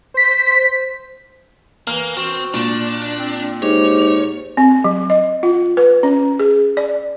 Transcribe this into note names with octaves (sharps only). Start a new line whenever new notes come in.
C5 B6
E3 A#3 F6
C4 F#4
A#2 D4
C4
G#2 G4 C#5
C4
F#3
D#5
F4
B4
C#4
G#4
D5